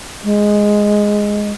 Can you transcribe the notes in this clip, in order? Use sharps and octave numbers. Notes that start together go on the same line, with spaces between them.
G#3